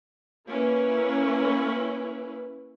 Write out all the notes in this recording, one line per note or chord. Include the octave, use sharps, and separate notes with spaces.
A#3 C#4 E4 B4